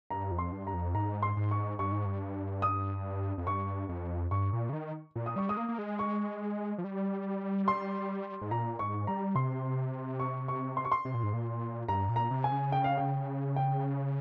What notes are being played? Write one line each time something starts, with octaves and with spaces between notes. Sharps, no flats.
G2 A#5
F2
C6
G2
A#5
F2
G#2 A#5
C6
G#2
C#6
G2 C#6
G#2
G2
D#6
F2
G2 C#6
F2
G2 C#6
A#2
C#3
D#3
A#2
D#6
G3 C#6
G#3 D#6
A#3
A#3
G#3
C#6
F3
G3
C6
G#2
A#2 A#5
G#2 C#6
G3 A#5
C3 C6
C#6
C#6
C6
C#6
C6
C3
A#2
G#2
A#2
G2 A#5
A#2
A#5
C3
G#5
C#3
G5
F5
G5
G5